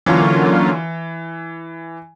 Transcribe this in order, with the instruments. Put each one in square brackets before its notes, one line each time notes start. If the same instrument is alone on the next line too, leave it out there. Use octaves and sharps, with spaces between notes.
[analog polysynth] D3 F#3 A#3 C#4 F4 [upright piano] E3